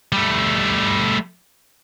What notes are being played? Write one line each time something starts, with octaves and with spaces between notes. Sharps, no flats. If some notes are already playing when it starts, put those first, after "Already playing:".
G3 A3